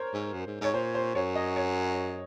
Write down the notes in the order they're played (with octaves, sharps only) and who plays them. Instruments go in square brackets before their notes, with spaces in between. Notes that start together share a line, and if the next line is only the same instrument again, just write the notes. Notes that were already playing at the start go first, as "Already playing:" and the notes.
Already playing: [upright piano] A#4 C5 C#5
[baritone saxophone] G#2
F#2
G#2
[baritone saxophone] G#2 [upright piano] C#5
[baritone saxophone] A#2 [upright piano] C5
[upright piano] C5
[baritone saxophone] F#2 [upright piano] C#5
[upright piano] D#5
C#5